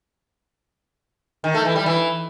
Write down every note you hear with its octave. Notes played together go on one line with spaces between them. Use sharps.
D#3
A3
E3
G3
E3